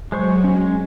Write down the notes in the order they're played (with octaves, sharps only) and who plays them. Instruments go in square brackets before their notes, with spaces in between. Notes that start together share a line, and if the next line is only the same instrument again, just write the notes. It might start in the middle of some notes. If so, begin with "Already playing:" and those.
[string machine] F#3 [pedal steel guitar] G#3 C5 C#6
[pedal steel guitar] G#3 C#4